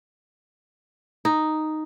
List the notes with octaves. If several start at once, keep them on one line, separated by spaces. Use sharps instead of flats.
D#4